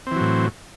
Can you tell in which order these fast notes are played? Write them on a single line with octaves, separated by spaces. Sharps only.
C4 E3 F#3 A2